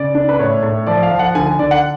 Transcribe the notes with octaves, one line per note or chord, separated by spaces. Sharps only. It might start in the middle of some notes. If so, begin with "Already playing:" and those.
Already playing: C#3 D5
D4
B4
A2 C#5
A2
F3 D5
F5
F3
F#5
D3 G#5
G#5
D3 D5
F#5